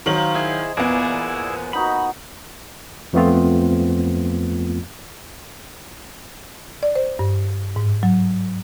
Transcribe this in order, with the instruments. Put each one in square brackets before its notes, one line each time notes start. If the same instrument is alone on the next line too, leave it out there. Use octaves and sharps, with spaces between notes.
[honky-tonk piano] D#3 F#3 F#7 [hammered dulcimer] C5 F5 A#5
[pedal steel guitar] E4 G#4 [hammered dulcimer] D#5
[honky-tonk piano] E2 B3 [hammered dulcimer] A#2 [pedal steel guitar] E4 G#4 D5
[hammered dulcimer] B3 D#4 F#4 [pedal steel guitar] B5
[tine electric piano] F2 F3 A3 B3 C4 F4
[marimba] D5
C5
G2
G#2
F#3